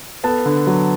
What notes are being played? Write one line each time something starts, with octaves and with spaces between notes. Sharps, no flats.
B3 A4 A5
D3
F#3